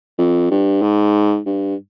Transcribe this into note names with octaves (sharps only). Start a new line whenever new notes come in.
F2
G2
G#2
G2